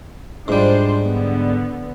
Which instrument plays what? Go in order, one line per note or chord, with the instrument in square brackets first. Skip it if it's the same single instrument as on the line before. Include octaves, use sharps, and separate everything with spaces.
[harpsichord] G#2 G3 [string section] D4 F4 C5
[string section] D3 B3